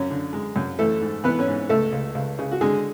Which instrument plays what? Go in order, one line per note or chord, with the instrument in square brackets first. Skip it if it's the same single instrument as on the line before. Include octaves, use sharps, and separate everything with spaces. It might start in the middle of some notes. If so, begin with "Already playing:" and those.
Already playing: [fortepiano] F#2 C#4 C#5
D3
G#3
F#2
E3 A3 A4
G#2
E3 B3 B4
C#4 C#5
G#2
C#2 A3 A4
C#2
C#2
C#3
F#4
D3 G#3 G#4